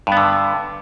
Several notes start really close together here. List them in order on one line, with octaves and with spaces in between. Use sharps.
G2 B3 D3